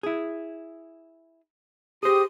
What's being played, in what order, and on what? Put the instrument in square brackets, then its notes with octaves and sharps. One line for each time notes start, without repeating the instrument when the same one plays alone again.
[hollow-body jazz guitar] E4 G#4
[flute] G4 [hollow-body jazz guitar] G#4 C5 [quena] D#6